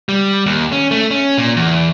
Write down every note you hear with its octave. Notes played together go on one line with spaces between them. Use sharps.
G3
D#2
C#4
A3
C#4
A#2
E2